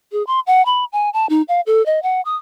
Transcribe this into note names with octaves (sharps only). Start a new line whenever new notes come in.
G#4
C6
F#5
B5
G#5
A5
D#4
F5
A4
D#5
F#5
D#6